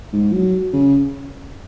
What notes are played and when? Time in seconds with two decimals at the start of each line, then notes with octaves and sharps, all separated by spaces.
0.13 G#2
0.33 F#3
0.73 C#3